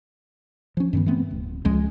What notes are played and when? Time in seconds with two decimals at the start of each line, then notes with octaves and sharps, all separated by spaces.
0.77 F3 C#4
0.93 G2 D#3 B3
1.06 E3 A3 B3 C4
1.31 D1
1.65 C#2 F3 G#3 C#4